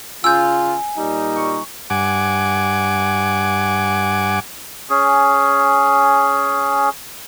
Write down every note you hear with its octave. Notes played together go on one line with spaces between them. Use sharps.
C#3 F4 G#5 E6 G6
A#2 G3 D#4
C#6
G2 F#5 G#5 D6
C#4 G#4